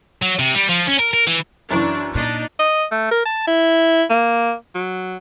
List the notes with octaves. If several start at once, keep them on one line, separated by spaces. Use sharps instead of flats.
F#3
C3
G3
F3
C#4
A#4
A#4
E3
F#2 E3 D4 C#6
A#2 D4 D#4
D#5
A3
A#4
A5
E4
A#3
F#3